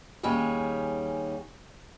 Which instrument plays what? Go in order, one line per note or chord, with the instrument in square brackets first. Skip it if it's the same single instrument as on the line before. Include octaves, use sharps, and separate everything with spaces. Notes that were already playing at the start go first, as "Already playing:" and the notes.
[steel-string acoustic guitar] D#2 G3 C#4 G#4